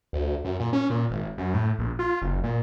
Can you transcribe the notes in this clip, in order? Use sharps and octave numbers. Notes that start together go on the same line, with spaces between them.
D2
F#2
A#2
C#4
A#2
G#1
F#2
A2
A#1
F4
F#1
A#2